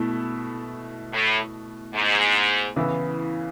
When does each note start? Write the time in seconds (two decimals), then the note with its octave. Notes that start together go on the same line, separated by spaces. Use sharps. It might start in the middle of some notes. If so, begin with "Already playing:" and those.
Already playing: B2 A3 E4
1.13 A2
1.94 G#2
2.76 C#3 E3 B3 E4